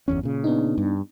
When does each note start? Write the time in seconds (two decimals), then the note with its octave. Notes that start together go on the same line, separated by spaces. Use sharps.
0.08 G1 E2 C#4
0.23 A#2 C#3
0.44 B3 D4 D#4
0.78 G2